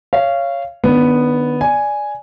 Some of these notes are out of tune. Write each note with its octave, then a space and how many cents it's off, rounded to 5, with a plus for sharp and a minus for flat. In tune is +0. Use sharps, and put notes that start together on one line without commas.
C#5 +0 F5 -20
D#3 -40 B3 +0 D4 -30
D5 +0 G#5 +0